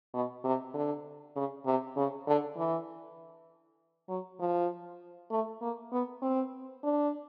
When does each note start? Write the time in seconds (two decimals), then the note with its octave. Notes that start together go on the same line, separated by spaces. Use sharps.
0.14 B2
0.44 C3
0.74 D3
1.36 C#3
1.66 C3
1.96 C#3
2.27 D3
2.57 E3
4.09 F#3
4.39 F3
5.31 A3
5.61 A#3
5.92 B3
6.22 C4
6.83 D4